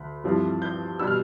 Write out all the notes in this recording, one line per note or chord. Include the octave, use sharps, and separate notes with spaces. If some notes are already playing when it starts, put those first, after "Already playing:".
Already playing: D2 B5
G2 F3 C4 E4
G6
B2 G3 D4 E6
F6